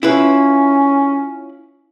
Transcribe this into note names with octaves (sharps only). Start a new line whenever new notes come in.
C#4 E4 F4 B4